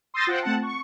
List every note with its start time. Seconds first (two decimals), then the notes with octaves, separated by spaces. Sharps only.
0.14 C6 D#6 E6 G6 A6 A#6
0.27 F4 C5 F#5 G5
0.42 A3 C4 F#5 A5
0.63 C#6